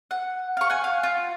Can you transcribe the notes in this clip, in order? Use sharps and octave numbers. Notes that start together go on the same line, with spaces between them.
F#5
F5 C#6
F#5 G#5
F5
F4